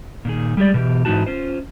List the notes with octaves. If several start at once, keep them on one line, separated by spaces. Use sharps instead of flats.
A#2 D#3 G#4
G3 G#3 G4 D5
B2 E3 G4
G#2 E3 G3 D#4 F#4 A5
C#4 F4 C5